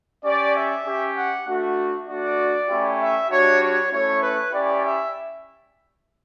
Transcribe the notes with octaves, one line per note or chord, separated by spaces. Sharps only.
C#4 G4 D5
E5
C#4 G4
F#5
A3 D4 F#4
A3 D4 F#4 D5
A3 C#4 E4 G4
E5
G3 D4 F#4 C#5
C#5
A3 C#4 E4 C#5
B4
C#4 E4 G4 D5
E5